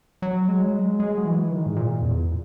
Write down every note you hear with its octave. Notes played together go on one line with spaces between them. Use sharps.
F#3
G#3
F#3
G#3
G#3
F#3
E3
D#3
G#2
A#2
E2